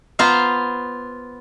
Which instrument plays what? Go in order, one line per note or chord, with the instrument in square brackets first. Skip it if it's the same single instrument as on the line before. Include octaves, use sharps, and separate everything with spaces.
[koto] B3 F4 C5 A#5